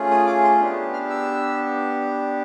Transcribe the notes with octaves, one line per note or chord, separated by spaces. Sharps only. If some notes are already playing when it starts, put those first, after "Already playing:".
Already playing: A3 C#4 F4 G#4
D#6
D6
C6
B3 D4 G4
F6
E6